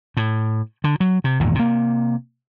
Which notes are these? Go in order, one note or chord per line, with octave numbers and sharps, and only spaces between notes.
A2
D3
F#3
C3
G#1 E2 A#2
C3 A#3